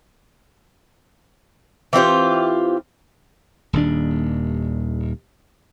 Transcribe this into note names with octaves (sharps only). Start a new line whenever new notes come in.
E3 C4 F4 G4
D#1 D#2 D4